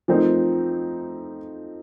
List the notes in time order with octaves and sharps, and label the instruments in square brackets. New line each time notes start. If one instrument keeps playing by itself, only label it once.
[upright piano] F3 A3 C4 D#4 A#4